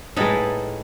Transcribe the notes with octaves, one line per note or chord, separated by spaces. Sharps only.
A2 G#3 D#4 A4 B4